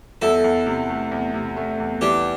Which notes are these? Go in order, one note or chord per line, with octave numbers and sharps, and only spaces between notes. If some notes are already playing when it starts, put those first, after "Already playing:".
E2 E4 A4
E2
C3
A3
E2
C3
A3
E2
E3 D4 G4